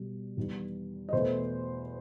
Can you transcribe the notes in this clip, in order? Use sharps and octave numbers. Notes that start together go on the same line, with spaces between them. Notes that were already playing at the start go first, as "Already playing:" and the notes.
Already playing: B2 G3
E2 D#3 G3
D#5
E2 B2 A3 C5